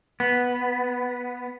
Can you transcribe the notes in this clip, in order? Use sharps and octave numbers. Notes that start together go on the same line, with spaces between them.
B3